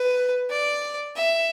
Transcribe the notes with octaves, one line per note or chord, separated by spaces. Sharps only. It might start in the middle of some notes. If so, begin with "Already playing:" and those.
Already playing: B4
D5
E5